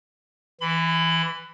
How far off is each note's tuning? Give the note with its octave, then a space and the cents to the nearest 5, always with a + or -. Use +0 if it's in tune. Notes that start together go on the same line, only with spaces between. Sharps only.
E3 +0 B5 +30